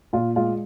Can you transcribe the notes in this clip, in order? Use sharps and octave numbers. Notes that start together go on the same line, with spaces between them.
A#2 F4
G#3 F4